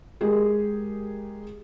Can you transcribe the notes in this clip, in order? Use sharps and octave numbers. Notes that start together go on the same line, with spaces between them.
G#3 G4 G#4 A#4